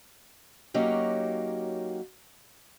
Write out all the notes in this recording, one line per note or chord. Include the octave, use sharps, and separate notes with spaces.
F#3 A#3 C#4 D#4 F#4 G4